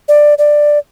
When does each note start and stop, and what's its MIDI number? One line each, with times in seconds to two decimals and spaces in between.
0.08 0.34 74
0.38 0.79 74